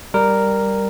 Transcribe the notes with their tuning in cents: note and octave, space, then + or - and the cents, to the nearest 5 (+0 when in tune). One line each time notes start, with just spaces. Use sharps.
G3 +0 A#4 -5